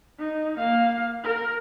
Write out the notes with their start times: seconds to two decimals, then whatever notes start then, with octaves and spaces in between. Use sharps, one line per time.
0.19 D#4
0.58 A#3 F5
1.24 A#4